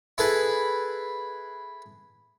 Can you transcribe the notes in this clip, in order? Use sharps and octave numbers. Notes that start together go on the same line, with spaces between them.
E4 G#4 A4 B4 G#5